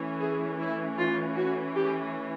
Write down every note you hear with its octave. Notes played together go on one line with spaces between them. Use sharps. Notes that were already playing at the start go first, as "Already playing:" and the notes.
Already playing: E3 A3 C#4 E4
G#4
E4
F4
F#4
G4